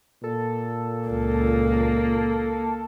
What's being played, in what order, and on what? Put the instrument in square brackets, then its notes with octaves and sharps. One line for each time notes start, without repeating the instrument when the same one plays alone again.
[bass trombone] A#2 [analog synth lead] A4
[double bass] C#2 [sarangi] A#3